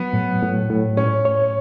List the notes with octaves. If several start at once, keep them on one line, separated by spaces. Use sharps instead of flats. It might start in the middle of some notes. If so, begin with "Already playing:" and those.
Already playing: F#3 B3
A2
A2
A2
C#4 C#5
C#5